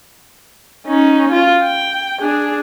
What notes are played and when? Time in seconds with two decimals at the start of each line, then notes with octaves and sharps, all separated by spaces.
0.87 C#4 D#4
1.32 F4
1.63 G5
2.21 D4 G#4